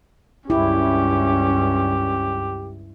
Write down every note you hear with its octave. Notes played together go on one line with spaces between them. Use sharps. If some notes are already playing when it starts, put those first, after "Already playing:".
C#2 G2 C#4 E4 G4